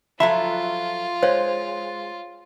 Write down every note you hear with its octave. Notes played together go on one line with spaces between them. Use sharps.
F3 F#3 F4 A4 E5 B5
G#3 C5 C#5 F5